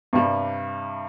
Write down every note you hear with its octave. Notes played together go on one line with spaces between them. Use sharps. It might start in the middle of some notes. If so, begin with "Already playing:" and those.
G2 C3 G3